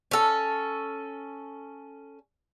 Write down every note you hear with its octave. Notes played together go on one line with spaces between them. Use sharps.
C#4 A4